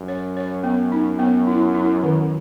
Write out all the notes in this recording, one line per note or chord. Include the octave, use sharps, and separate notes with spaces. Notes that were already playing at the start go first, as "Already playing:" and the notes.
Already playing: F#2
C#5
C#5
B3
D#4
B3
E4
E4
D#3